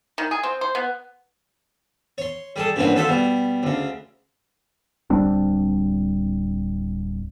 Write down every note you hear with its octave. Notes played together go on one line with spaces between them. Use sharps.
D#3
G#4
C4
C5
B3
C#5 C6
G3 G#4 A4
G2 A#2 C#3 E3 C4 F#4
F3 G#3 F#4 A4 C5 E5
B2 G3
D2 C#3
D1 G3 C4 D4